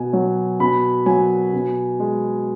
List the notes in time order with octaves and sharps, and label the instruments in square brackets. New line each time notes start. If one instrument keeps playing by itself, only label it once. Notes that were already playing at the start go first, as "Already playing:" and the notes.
Already playing: [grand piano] B2 G#5
F#3
B2 B5
F#3 G#5
B2
G#3